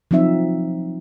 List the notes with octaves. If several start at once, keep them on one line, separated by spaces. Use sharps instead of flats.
F3 F#3 C4 D#4 E5